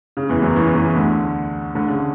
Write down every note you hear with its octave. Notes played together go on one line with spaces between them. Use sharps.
C#3
E2 E3
F#2 F#3
E2 E3
E2 E3
D2 D3
D2 D3
C#3